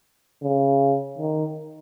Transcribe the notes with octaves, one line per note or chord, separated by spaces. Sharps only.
C#3
D#3